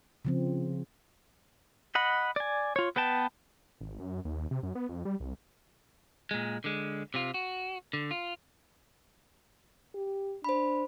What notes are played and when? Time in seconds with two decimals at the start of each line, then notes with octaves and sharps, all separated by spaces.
0.25 C#3 F3 C4
1.95 D#5 F#5 B5
2.36 D5 G#5
2.76 F4 C#5
2.96 B3 B4 G5 A5
3.81 G#1
3.99 F#2
4.25 D#2
4.51 C3
4.63 F#2
4.75 B3
4.89 F2
5.05 G3
5.20 C2
6.31 A#2 G#3
6.64 D3 G#3
7.14 C3 F4
7.34 F#4
7.93 D3
8.11 F4
9.95 G4
10.44 D4 C5 B5